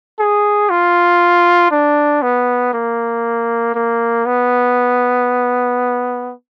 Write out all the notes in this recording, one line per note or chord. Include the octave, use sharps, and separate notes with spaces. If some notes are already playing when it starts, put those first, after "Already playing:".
G#4
F4
D4
B3
A#3
A#3
B3